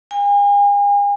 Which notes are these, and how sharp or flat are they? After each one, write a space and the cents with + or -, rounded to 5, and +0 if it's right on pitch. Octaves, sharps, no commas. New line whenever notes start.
G#5 -40